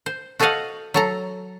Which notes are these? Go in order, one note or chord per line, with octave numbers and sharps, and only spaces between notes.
C5
F#4 A4 C5 D#5 F5 F#5
F#3 A4 A#5